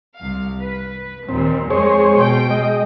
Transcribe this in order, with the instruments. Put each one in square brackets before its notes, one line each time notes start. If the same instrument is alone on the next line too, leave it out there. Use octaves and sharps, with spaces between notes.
[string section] C2 F5
B4
[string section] D#2 A#2 [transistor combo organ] C4
[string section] F2 G#3 [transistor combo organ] G#4 C5 C#5
[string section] B2 G5
[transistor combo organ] G#3 D#5